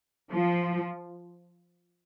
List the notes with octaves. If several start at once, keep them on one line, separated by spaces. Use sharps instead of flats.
F3